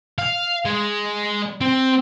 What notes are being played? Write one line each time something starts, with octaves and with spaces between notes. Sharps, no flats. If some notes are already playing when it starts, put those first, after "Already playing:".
F5
G#3
C4